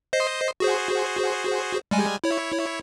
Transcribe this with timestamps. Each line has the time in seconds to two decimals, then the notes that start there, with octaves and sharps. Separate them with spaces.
0.13 C5 D#5 C7
0.60 F#4 G#4 C5
1.91 G3 G#3 G#5
2.24 E4 C#5